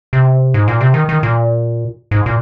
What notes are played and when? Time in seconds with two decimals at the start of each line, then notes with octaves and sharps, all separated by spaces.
0.13 C3
0.54 G#2
0.68 A#2
0.81 C3
0.94 D#3
1.09 D#3
1.23 A#2
2.11 G#2
2.26 A#2